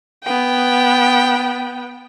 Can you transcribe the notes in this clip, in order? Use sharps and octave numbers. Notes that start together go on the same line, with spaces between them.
B3 G5